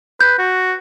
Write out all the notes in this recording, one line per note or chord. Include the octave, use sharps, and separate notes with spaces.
B4 G6
F#4